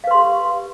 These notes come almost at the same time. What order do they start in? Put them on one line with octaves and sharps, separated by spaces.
F5 B4 C6 G4